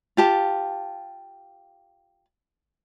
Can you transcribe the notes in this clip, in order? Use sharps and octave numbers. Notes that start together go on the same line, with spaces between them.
F4 G4 A5